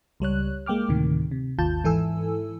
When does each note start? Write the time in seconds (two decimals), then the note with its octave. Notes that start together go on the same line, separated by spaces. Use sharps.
0.20 C#2 G3 C#5 F#6
0.66 G#3 A#3 G5 D6 F6
0.89 D2 A2 C3 D#3
1.31 C3
1.58 G#1 D#2 F4 A5 G6
1.84 G#2 E3 E4 A4 G#5 E6